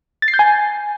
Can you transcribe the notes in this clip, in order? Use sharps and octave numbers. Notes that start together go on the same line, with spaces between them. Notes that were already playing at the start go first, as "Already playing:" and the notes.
A6
C7
G6
G#5